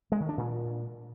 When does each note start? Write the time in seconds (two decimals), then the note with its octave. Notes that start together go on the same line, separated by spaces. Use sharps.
0.12 G#3
0.20 D#3
0.29 D4
0.37 A#2